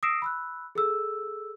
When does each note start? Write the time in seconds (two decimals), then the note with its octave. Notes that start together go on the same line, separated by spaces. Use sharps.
0.03 D#6 E6 A#6 C7 D7 E7
0.22 B5 E6 F#6
0.75 G#4 A4 E6